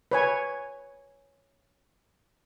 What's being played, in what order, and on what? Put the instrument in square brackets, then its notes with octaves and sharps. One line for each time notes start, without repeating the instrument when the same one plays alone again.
[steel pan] B4 C#5 G#5